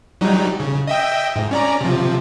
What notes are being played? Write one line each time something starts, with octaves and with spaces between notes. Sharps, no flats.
F#3 G3 D#4
C#3
D#5 E5 G5
G#2
C#4 D5 A#5
C3 F3